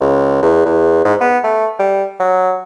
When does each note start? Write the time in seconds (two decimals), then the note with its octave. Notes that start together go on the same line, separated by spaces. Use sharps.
0.01 C#2
0.43 E2
0.66 E2
1.05 G#2
1.21 B3
1.44 A3
1.79 G3
2.20 F#3